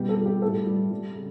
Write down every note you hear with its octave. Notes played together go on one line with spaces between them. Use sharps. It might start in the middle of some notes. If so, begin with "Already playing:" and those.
Already playing: B2 G3 G4
A4
G3
G4
A2 A4
G3
G3
C#3